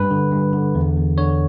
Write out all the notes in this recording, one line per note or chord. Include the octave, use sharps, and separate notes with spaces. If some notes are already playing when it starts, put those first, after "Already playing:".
Already playing: G2 B4
D3
G2
D3
E2
E2
D3 C#5